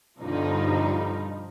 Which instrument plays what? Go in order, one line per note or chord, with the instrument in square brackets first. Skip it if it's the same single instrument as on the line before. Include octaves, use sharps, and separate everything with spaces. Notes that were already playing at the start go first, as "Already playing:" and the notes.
[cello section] G2 B2 D3 [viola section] F3 G3 [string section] D#4